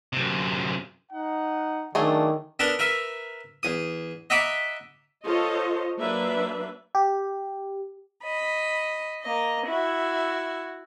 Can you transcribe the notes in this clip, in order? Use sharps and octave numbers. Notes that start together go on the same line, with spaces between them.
F#2 C3
D#4 F#5
D#3 F#3 A3 D4 G#4 A4 D5
B3 D4 A4 A#4
A#4 B4 E5
E2 D#6
D#5 E5 F#5 A#5 B5 D6
F4 A4 C5 C#5 D#5
F#3 A#3 D4 B4 E5
G4
D#5 B5
A#3 D#5
E4 F#4